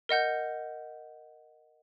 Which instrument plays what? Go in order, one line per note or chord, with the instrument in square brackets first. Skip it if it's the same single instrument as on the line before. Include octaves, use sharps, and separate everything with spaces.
[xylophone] A#4 D#5 F#5 G6